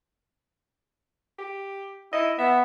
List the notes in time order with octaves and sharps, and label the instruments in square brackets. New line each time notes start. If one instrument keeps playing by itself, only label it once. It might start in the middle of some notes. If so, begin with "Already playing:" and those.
[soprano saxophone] G4
[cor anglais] E4 [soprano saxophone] D#5
[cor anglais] B3 [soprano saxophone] E5